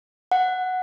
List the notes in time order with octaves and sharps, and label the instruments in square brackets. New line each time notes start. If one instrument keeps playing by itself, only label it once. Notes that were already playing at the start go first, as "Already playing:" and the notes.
[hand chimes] F#5